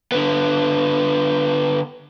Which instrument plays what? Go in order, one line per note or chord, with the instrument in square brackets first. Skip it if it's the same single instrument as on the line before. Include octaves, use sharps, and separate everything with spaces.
[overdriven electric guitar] D3 B3